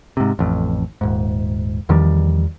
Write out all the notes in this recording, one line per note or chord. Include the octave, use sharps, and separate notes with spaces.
G#2 C3
A1 F2
D#1 G#2
E2 D#3 F3 G3